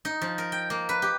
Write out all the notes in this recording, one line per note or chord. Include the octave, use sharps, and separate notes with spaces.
D#4
F3
A#4
G5
A#3
B4
G4